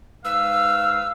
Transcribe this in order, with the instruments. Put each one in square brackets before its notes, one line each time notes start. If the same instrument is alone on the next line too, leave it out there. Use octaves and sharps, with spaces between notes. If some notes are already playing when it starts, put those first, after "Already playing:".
[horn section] G#2 B4 F5 [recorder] E6